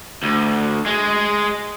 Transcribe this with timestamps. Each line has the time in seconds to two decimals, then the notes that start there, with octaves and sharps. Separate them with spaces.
0.23 D2
0.86 G#3